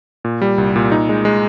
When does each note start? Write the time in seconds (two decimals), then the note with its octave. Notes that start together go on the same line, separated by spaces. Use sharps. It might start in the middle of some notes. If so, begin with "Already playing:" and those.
0.25 A#2
0.41 G3
0.58 C2
0.76 A#2
0.92 D#4
1.09 G#3
1.25 G#3